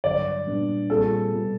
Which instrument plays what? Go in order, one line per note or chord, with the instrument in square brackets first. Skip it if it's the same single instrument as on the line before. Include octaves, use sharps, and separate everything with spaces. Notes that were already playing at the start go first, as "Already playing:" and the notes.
[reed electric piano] G2 D3 F#3 [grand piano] D5
[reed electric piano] A#2 G3 B3 D4
[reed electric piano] A#2 G3 C4 F4 G#4 [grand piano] A4
[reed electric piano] B2 G3 B3